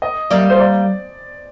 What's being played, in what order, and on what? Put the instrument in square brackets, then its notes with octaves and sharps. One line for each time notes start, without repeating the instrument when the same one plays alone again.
[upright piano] D#5
[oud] G3 A#3 [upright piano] D5
[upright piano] C5
D5